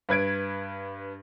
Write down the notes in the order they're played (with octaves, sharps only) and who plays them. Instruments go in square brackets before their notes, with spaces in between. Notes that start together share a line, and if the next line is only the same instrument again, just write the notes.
[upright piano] G2 B4 G#6 D7